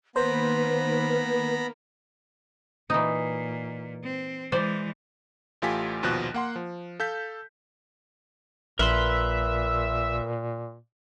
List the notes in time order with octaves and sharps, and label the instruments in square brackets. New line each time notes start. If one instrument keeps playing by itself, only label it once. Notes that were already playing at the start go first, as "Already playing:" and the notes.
[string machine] D#3 A#3 [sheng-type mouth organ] B3 A#5 B5 [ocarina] B4 [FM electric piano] C5
[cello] A#2 [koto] E3 D#4
[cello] C4
[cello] E3 G#3 [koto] C5 D5
[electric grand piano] A1 A3 F4 G4 G#5 B6
A#1 D#2 B2 F3 F#6
A#3 F#5 C6
F3
A4 F5 G6 B6
[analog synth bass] A#1 [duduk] A#2 [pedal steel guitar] A#4 B4 C6 [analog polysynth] E5